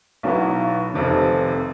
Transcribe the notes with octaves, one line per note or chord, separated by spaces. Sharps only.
B1 B2 F#3 B3 E4
F1 F2 C3 D#3